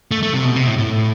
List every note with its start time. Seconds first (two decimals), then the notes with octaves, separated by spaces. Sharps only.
0.11 A3
0.22 A3
0.33 C3
0.44 B2
0.56 C3
0.67 A2
0.78 A2